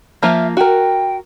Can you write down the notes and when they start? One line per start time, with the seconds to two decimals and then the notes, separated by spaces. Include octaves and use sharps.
0.23 F3 A#3 F4 E5
0.57 F#4 A#4 G5